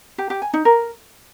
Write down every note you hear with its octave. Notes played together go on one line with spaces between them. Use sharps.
G4
G4
G#5
D#4
A#4